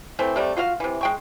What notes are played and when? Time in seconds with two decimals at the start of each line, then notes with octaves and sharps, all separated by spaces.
0.19 E3 A3 C4
0.36 C3 G3 A3
0.56 F4 F#4 F5
0.80 C3 E3
1.01 G#3 G5 C#6